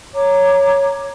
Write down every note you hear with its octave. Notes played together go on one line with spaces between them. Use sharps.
C#5 A#5 D6